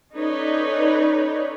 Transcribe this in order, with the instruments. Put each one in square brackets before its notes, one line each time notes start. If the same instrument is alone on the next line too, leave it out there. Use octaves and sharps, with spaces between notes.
[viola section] C#4 D#4 A4 B4 C#5 D5